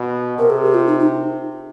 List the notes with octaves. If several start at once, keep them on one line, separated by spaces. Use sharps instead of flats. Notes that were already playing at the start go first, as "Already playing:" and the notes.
Already playing: B2
C3 A#4
G#4
G4
F4
D#4
D#4